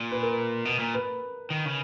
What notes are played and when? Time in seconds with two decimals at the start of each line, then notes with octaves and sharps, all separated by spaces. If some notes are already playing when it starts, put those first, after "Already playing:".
Already playing: A#2
0.11 B4
0.23 A#4
0.65 B2
0.79 A#2
0.94 B4
1.50 D#3
1.65 C#3